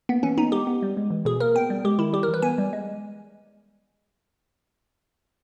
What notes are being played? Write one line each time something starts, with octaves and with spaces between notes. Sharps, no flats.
A#3 B3
E3 C#4
B3 D#4
G#3 G4
B3
G3
G#3
E3
B2 G#4
A#3 A#4
B3 G5
G3
G#3 G4
D#3 E4
G3 G4
A#4
E3
B4
B3 G#5
G3
G#3